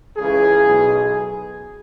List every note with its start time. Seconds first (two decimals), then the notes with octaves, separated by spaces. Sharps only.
0.16 C#2 C#3 E3 G#4
0.63 B1 B2 F#3